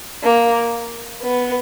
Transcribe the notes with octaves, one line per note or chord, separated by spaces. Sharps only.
A#3
B3